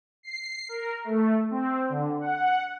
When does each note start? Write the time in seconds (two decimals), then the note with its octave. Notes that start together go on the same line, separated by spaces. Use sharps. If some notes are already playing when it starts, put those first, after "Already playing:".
0.23 C7
0.69 A#4
1.04 A3
1.51 C4
1.89 D3
2.21 F#5